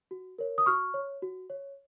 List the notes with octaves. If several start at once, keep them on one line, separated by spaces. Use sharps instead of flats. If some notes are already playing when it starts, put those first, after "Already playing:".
F#4
A#4 C#5
D#6
F#4 C#6 F6
C#5
F#4
C#5